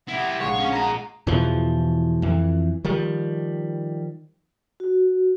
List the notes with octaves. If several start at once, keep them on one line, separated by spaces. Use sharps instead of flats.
E4 G4 F#5
A#1 G#3 C#5 F#5
C#4
D#5 A5 A#5
E2 B2 E3 F3
F2 E3
D#3 F3 G3
F#4